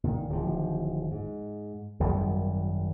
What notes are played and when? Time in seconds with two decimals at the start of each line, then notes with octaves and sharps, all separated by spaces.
0.04 A#2 D#3
0.29 D1 D#3 F3
1.11 G#2
2.00 G#1 F#2 D#3 G3